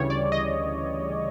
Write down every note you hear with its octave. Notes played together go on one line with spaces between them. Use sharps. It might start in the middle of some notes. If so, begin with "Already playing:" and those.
Already playing: D2 C#3 E3 G3 C#5
D5
D#5